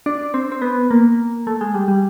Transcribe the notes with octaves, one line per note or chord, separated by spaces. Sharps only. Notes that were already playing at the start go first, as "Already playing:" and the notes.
D4
C4
C4
B3
A#3
A3
G#3
G3
G3